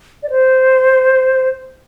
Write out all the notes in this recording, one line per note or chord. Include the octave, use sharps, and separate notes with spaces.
D5
C5